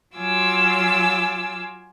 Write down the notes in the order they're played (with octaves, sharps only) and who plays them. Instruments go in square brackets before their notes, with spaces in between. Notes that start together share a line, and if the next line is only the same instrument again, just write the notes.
[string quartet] F#3 F4 G#5 D6 E6